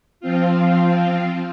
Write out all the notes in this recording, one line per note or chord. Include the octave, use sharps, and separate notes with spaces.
F3 C4 F4